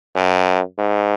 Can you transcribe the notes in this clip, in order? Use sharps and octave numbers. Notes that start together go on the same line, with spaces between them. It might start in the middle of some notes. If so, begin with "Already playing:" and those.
F#2
G#2